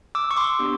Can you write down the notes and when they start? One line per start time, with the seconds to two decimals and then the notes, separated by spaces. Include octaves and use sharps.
0.15 D6 E6
0.31 C#6
0.37 C6 D6
0.59 B3 D4 G4